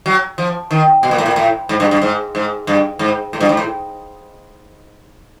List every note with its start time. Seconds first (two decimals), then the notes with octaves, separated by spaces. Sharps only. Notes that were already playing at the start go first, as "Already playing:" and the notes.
0.06 F#3
0.38 F3
0.71 D#3
1.03 B2
1.11 A#2
1.18 A2
1.26 A#2
1.36 A2
1.69 G#2
1.80 G2
1.91 G2
2.02 G#2
2.35 G#2
2.67 G2
2.99 G#2
3.33 A2
3.40 G2
3.49 G#2
3.57 A2